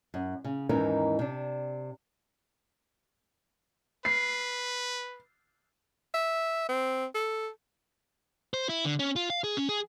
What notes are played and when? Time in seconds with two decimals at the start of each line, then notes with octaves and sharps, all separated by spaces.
0.14 F#2
0.45 C#3
0.69 D#2 G#2 E3 C#4 D#4 A#4
1.19 C3 D4
4.05 B4 C7
6.14 E5
6.69 C4
7.15 A4
8.54 C5
8.69 E4
8.85 D3
8.99 C#4
9.16 F4
9.30 F5
9.44 G#4
9.57 C#4
9.69 G#4